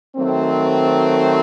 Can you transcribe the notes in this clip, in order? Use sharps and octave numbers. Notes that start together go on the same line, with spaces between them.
D#3 F#3 A3 C4